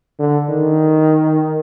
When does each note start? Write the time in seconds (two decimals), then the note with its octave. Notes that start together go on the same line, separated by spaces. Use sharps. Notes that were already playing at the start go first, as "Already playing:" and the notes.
0.20 D3
0.49 D#3